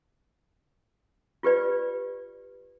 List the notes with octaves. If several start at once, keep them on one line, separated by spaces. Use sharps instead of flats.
F4 G4 B4 D5